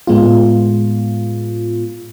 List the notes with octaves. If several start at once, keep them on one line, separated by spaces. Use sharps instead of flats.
A2 G#3 B3 F4